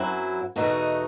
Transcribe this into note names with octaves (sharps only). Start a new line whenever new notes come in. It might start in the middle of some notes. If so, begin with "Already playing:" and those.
Already playing: F#2 F#3 C4 E4
E2 B2 A3 D#4 F#4